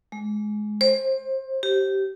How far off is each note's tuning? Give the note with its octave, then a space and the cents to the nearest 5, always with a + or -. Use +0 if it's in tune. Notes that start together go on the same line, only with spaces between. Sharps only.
G#3 +20
C5 +25
G4 -20